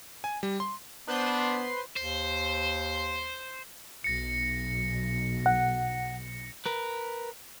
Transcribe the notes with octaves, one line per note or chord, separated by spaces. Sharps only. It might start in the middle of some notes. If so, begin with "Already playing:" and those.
G#5
G3
C6
B3 D4 B4 C5 C6
D#2 C5
B1 A#6 C#7
F#5
A#4 B4